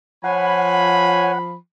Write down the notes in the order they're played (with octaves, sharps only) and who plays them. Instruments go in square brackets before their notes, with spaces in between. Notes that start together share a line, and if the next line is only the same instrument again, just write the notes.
[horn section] F3 B5 [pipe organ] C#5 G#5 [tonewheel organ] F#5